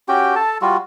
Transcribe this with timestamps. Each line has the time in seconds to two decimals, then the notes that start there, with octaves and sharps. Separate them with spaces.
0.08 C#4 F#4 G4 G5
0.36 A4 A5
0.62 G3 F4 F#4